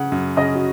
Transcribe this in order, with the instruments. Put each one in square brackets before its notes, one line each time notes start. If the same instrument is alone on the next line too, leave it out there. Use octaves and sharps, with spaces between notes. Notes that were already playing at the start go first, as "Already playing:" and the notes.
Already playing: [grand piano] C#3 [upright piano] F#5
[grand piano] F#2
[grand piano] C#3 [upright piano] D#5
[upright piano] F#4